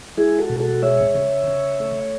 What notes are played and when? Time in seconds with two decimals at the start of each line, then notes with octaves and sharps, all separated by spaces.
0.17 G#3 E4 G#4
0.39 F#4 A4
0.50 B2
0.60 F#4 A4
0.82 G#3 C#5 E5
1.14 C#3
1.47 C#3
1.80 A3